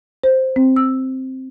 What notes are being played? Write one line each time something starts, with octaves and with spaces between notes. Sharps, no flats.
C5
C4
E6